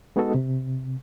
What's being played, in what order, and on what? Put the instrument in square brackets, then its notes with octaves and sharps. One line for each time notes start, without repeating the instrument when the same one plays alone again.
[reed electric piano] G#3 B3 D#4 F#4 A4 D#5
C3